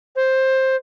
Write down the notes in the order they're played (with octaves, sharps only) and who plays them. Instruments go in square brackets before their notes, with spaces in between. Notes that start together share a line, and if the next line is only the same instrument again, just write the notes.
[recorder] C5